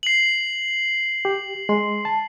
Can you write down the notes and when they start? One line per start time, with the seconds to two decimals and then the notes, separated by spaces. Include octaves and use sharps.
0.03 C7 F#7
1.25 G4
1.69 G#3 C6
2.05 A5